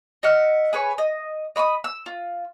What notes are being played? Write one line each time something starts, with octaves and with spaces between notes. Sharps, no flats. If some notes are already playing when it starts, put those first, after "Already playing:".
D#5 E5 F#5 F6
G#4 B4 C#5 C#6
D#5
D#5 B5 C#6 D#6
E6
F4